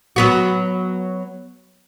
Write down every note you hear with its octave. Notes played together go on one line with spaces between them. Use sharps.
F#3 B3 F#4